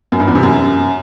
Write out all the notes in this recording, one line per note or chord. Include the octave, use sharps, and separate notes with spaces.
F#2
G2
E2
C3
F#2